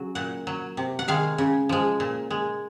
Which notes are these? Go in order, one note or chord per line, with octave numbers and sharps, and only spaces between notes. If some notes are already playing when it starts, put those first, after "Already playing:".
Already playing: C#3 F#3
A#2 F#5
F#3
C3
F#5
D#3 G#3 F5
C#3
F3 G#3
A#2
G#3